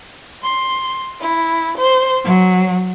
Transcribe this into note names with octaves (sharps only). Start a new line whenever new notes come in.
C6
E4
C5
F#3